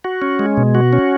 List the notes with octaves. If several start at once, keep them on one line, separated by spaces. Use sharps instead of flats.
F#4
C#4
G#3
B2
F#4
C#4